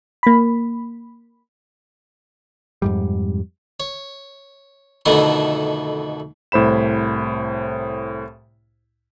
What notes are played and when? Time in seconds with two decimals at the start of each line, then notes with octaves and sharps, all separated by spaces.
0.23 A#3 B5
2.82 F2 G#2 G3
3.80 C#5
5.06 F2 B2 D3 D#3 A3 E4
6.52 C2 A2 C5 B5 E7